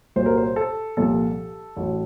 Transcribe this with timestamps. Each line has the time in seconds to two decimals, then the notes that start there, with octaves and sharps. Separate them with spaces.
0.16 C2 A#2 F#3 C5
0.26 A#4
0.37 C5
0.56 A4
0.97 C2 A#2 F3 A4
1.77 A1 A2 F#3